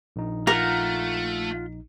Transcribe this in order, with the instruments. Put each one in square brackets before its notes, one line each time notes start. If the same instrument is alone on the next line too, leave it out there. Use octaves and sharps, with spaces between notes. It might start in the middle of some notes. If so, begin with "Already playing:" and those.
[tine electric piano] A#1 D#4
[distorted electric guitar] A3 [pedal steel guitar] F4 F#5 A#5 [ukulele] A#4